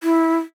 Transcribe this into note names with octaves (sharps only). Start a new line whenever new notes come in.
E4